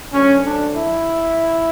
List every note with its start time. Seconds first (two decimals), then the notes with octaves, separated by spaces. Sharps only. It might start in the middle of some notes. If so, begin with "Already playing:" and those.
0.12 D2 D3 F#3 C#4
0.44 D4
0.76 E4